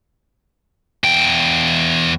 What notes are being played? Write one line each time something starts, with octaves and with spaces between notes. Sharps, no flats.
E2 G5